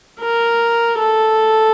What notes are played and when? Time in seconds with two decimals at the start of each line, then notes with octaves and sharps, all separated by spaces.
0.20 A#4
0.98 A4